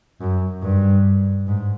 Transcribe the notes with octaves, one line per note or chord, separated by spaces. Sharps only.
F#2
G2
G#2